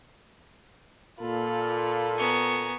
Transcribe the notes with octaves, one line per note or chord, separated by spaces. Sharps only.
A#2 F4 A4 B5
B3 G#5 A#5 C#6